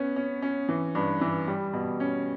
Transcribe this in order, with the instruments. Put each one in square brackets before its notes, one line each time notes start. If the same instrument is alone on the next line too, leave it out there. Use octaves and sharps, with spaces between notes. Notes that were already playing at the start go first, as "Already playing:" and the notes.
Already playing: [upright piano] B3 C#4
C#4
C#4
E3
G2
E3
G3
B2
C#4